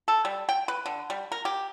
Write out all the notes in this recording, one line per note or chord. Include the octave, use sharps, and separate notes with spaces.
A4
G3
G5
B4
D3
G3
A#4
G4